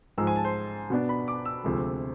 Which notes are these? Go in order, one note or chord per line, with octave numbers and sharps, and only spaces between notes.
G#2 F3 G#3 E6
G#5
A5
C5
B2 B3 D4
B5
D6
E6
D2 C3 F3 G#3